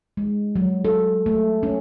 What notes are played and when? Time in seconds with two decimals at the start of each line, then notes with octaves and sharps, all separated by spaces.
0.17 G#3
0.56 F#3
0.85 A4
1.26 A3
1.63 C#4